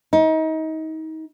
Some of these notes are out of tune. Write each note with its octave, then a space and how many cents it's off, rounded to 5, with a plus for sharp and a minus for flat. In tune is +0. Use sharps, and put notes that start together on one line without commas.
D#4 +30